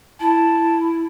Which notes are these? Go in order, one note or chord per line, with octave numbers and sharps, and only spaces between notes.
E4 A5